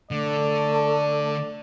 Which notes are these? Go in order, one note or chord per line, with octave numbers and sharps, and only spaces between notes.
D3 A3 D5